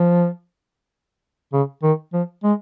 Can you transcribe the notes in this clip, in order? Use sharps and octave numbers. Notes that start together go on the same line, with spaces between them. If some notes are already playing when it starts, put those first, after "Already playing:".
Already playing: F3
C#3
D#3
F3
G#3